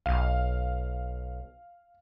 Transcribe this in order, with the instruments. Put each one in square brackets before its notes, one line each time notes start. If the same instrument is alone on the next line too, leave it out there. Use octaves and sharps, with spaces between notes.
[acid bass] B1 [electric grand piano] F5